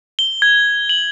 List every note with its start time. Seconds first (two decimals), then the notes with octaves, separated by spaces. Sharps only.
0.19 G7
0.42 G#6
0.89 F#7